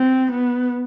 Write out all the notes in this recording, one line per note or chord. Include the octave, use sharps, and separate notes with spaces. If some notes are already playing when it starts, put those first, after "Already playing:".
Already playing: C4
B3